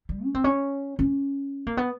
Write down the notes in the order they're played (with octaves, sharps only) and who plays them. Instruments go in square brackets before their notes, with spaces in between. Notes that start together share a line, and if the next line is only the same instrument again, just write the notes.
[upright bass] G3
C#4
C4
C#4
C#4
A#3
B3